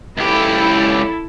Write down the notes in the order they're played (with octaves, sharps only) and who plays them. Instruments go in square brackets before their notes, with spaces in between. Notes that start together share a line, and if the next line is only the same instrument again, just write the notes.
[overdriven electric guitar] C#2 G4 [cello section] E4 A4